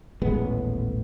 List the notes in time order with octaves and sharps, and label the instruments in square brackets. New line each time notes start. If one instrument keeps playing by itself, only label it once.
[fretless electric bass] D#1 A1 G#3 B3